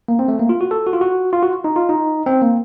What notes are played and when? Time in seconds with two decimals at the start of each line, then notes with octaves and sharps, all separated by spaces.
0.08 A#3
0.19 C4
0.28 A3
0.39 A#3
0.49 F4
0.61 F#4
0.71 A4
0.87 F#4
0.93 F4
1.01 F#4
1.33 F4
1.43 F#4
1.64 D#4
1.76 F4
1.89 D#4
2.26 C4
2.42 A#3